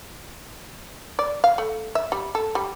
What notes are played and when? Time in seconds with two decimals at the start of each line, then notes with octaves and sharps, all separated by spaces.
1.19 D5
1.44 F5
1.58 A3
1.95 E5
2.12 G3
2.35 A4
2.55 G3